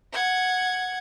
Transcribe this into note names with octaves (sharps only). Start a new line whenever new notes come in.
F#5 G#6